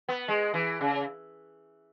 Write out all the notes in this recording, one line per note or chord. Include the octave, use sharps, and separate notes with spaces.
B3
G#3
E3
C#3